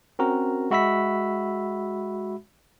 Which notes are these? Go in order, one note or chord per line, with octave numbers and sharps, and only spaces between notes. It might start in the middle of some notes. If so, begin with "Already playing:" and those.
C4 C#4 F#4 A#4 A#5
G#3 F#4 E5 B5 E6 B6